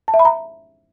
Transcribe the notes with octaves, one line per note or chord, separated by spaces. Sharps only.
A5
E5
B5
A#5